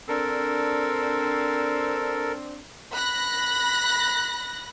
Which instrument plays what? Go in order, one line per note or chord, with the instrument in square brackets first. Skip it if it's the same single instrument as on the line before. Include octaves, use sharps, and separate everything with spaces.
[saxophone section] C4 D4 [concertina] A4 A#4
[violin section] B5 F#6 A#6